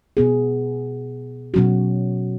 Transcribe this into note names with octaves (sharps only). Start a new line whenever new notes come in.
B2 B3 G#4
B2 F#3 C#4 F#4